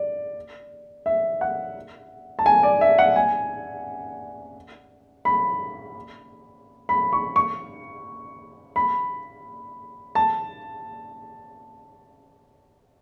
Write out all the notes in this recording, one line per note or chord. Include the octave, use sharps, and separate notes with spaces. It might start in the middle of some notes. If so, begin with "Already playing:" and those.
Already playing: D5
E5
F#5
A5
G#5
D5
E5
F#5
G#5
B5
B5
C#6
C#6
B5
A5